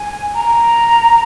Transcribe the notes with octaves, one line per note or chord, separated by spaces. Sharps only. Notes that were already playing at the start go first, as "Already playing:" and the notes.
Already playing: G#5
A#5